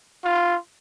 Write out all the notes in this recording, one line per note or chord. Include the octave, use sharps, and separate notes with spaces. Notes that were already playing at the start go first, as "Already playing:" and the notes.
F4